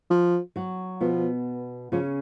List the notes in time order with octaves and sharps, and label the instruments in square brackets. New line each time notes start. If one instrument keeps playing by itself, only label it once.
[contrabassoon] F3
[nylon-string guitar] F#3 F#4
[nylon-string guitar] B2 B3 [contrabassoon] F3
[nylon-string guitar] C#3 C#4 [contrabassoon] F3